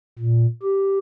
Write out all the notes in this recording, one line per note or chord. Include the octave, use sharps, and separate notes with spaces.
A#2
G4